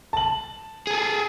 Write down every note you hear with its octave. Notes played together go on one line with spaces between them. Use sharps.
A5 F#7
G#4 A4